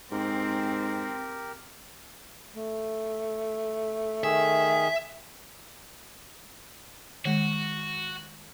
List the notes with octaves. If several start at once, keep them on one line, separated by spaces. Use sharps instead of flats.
G#2 C4 G4 A#4
A3
D#3 G#4 E5
D#3 G#3 F#4